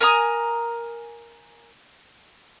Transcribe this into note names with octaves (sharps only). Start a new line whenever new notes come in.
A#4 G#5 A#5 D#6